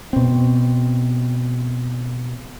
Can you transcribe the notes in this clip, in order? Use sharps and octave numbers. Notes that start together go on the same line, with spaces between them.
B2 C4